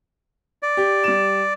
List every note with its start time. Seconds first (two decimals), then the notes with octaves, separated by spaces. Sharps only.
0.63 D5
0.77 G4
1.04 G3 E7